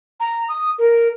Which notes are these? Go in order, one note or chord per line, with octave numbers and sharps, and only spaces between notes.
A#5
D#6
A#4